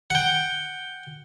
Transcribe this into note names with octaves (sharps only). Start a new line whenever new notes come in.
F#5 G5